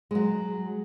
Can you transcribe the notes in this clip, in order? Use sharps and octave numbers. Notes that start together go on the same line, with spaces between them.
F#3 G#3